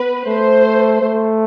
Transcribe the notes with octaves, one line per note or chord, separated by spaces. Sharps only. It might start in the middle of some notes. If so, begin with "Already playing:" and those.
Already playing: B3 B4
A3 C5
A3